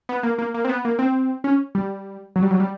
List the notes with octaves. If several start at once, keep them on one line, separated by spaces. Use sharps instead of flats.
B3
A#3
A#3
A#3
C4
B3
A#3
C4
C#4
G3
F#3
G3
F#3
G3